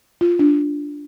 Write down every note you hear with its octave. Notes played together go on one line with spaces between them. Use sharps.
F4
D4